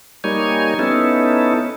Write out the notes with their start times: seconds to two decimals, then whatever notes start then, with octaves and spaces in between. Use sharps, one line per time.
0.24 G3 A#3 D#4 C#5 G#5
0.79 B3 C#4 D#4 E4 A4